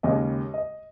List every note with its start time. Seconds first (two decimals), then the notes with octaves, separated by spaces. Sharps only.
0.03 D#2 C#3 G#3 C#4 D#5
0.54 D#5